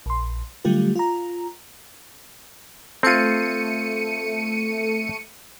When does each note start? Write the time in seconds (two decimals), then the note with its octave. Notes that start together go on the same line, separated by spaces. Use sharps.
0.06 A#1 C6
0.65 D3 F#3 G3 A3 F4 G4
0.95 F4 A#5
3.03 A3 C4 F4 C#7 D#7